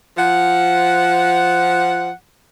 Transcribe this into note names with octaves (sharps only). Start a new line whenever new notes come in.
F3 F#5